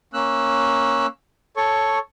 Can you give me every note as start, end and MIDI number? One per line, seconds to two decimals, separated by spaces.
0.14 1.07 58
0.14 1.07 61
0.14 1.07 88
0.14 1.07 90
1.57 1.99 69
1.57 1.99 73
1.57 1.99 85